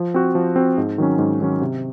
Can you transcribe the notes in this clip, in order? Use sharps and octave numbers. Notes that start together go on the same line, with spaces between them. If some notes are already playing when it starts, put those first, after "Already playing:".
Already playing: F3
C4 F#4
F3
C4 F#4
G#2
D#3 F#3 C#4
G#2
D#3 F#3 C#4
C3